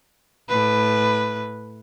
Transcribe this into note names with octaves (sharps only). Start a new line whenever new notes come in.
A2 B4